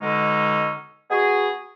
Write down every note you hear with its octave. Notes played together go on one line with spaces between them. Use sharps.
B2 D3 G#3 C#4 D#4
B3 F#4 G#4